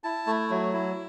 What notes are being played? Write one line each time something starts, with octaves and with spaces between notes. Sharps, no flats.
E4 A5
A3
F#3
E4